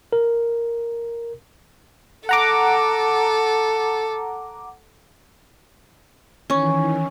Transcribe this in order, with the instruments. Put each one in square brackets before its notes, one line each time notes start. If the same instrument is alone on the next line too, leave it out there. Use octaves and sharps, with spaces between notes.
[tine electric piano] A#4
[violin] A4 [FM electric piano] F#5 A#5 D6
[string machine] D#3 E3 [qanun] C#4 [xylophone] C#5 C#6